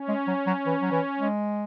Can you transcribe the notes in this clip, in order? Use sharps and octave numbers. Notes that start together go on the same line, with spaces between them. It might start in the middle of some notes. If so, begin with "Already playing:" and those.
Already playing: C#4
G#3
F#3
F#3
E3
F#3
E3
G#3